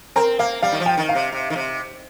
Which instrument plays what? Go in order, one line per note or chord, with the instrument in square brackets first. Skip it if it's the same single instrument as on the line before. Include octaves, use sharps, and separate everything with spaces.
[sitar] C4 [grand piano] A#4
[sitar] A#3 [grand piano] F5
[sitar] G3 [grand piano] F5
[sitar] D#3
F3
[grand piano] G5
[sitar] D#3
[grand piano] F5
[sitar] C3
C3
D#3
C3